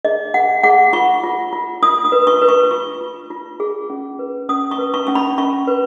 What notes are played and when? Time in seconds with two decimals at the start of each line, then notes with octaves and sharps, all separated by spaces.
0.05 G#4 D#5
0.34 G#4 F#5
0.63 G#4 F#5
0.93 F4 C#6
1.23 F4
1.53 F4
1.82 F4 D#6
2.05 D#6
2.12 B4
2.27 C#6
2.41 B4
2.49 C#6
2.71 F4 C#6
3.01 F4
3.30 F4
3.60 G#4
3.90 C#4
4.19 B4
4.49 C#4 D#6
4.71 C#6
4.79 B4
4.94 C#6
5.07 C#4 C#6
5.15 B5
5.38 C#4 C#6
5.67 B4